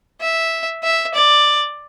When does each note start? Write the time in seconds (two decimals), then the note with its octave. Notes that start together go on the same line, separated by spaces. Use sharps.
0.21 E5
0.83 E5
1.14 D5